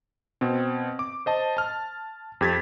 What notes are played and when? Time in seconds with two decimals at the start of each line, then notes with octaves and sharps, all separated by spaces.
0.41 B2 C4
0.99 D6
1.26 C5 D#5 A5
1.57 A5 F6
2.41 F2 G4 G#6 A6 B6